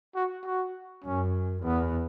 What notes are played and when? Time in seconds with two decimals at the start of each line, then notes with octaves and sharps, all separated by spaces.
0.15 F#4
0.45 F#4
1.04 F#2 C#4
1.63 E2 B3